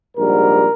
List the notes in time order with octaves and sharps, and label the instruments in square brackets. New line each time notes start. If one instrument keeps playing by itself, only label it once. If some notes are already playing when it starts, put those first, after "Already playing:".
[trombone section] A#1 G#2 G3 A#4